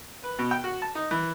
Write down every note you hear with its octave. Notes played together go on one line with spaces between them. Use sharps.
B4
B2
G5
F#4
A5
D#4
E3